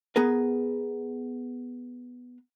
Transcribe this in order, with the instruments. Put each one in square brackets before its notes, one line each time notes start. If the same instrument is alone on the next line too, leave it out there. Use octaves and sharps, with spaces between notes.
[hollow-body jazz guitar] B3 G#4 A#4 B4